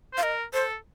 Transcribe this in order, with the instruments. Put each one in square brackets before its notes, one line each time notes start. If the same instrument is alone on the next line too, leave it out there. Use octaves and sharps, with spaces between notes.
[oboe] C5
[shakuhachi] F5
[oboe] A#4 [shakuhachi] D#5
[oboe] A4 [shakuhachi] C5